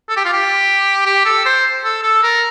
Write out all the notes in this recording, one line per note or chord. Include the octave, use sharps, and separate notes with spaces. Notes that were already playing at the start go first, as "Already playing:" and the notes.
A4
G4
F4
G4
G4
A4
C5
A4
A4
A#4